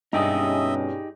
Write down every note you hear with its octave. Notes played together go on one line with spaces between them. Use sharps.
G2 B2 C#4 D#4 G4 G#4 D#5 E5